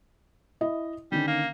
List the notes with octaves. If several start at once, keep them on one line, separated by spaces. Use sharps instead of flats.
E4 D#5 E5
D3 D#3 G3 C#4
A#3